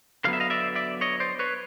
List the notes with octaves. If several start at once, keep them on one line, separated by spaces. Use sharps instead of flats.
D3 F#3 B3 F5
E5
D#5 F5
D5 E5
D5 E5
C#5 D#5
C5 D5
B4 C#5